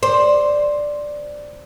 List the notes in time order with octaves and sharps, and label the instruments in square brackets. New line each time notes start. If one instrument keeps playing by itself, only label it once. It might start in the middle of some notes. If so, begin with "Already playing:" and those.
[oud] C5 [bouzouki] D5